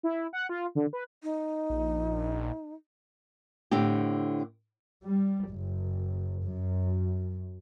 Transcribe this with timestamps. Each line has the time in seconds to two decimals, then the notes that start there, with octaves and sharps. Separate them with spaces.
0.03 E4
0.33 F#5
0.49 F4
0.75 D3
0.93 B4
1.23 D#4
1.70 A#1
3.71 A2 D3 C4 G4
5.05 G3
5.50 F#1
6.46 F#2